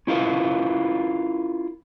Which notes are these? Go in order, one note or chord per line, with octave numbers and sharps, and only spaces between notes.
C#4 E4 F4 A#4 B4